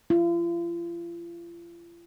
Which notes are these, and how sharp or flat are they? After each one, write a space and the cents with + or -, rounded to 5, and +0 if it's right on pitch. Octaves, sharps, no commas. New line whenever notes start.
F4 -40